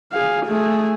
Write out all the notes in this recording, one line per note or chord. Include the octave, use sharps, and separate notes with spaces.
G#4 F5
A3 G#4